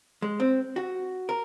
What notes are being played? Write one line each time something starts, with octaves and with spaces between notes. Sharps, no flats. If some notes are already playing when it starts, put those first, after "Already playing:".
G#3
C4
F#4
A#4